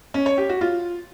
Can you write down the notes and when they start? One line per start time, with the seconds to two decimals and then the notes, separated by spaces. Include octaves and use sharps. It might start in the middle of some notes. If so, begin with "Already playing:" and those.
0.14 C#4
0.26 C#5
0.38 G4
0.49 F#4
0.61 F4